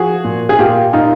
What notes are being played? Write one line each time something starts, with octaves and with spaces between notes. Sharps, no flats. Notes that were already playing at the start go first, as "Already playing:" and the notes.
Already playing: F3 F#4 G#4
A#2
G#4
A#2 F4 G4
A#2 D#4 F4